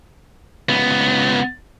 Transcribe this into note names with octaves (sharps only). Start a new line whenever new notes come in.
C#2 B3